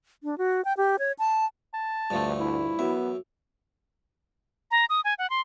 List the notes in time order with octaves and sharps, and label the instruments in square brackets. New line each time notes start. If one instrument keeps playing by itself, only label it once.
[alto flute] D4
F#4
G5
G4
C#5
A5
[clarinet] A5
[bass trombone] D2 [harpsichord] G2 F3 A3
[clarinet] E4
[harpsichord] F#2 E5 [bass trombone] B3
[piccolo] A#5
D#6
G#5
F#5
C6